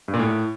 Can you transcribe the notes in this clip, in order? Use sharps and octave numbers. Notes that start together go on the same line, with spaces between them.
G2
A#2
A2